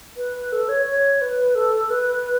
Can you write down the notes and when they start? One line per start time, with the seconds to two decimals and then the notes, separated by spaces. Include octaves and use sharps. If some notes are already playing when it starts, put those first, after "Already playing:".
0.17 B4
0.52 A4
0.69 C#5
0.86 C#5
1.21 B4
1.55 A4
1.90 B4